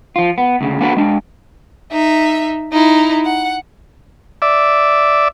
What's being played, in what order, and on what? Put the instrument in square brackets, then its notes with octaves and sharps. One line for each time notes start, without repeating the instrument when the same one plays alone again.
[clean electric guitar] F3 F4
B3
D2 C#3
A#3 B3 D4 F#4 A#4 B4
G#3 D4
[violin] D#4 E5
D#4 E4
F#5
[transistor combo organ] D5 E5